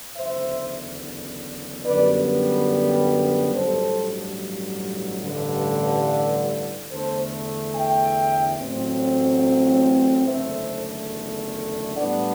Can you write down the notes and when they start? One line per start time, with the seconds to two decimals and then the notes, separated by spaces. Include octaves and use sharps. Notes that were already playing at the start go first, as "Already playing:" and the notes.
0.17 F#1 E2 D3 C5 E5
1.85 F#2 D3 G3 B3 B4 D5
3.54 A1 G2 F#3 A4 C5
5.22 A1 G2 D3
6.91 E2 D3 A3 A4 C5
7.75 E5 G5
8.59 A1 A2 F#3 C4
10.28 F#1 E2 D3 A3 C5 E5
11.97 A2 G3 B3 D4 D5 F#5